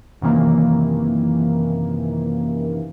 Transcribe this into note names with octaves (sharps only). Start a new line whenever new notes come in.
F#2 C3 D#3 E3 A#3